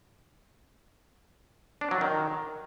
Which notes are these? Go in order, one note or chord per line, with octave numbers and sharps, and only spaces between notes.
D4
F#3
D#3